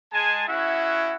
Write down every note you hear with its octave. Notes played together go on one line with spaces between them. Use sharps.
G#3 G#5 A5
C#4 E4 F#4 G#4 E5 F#5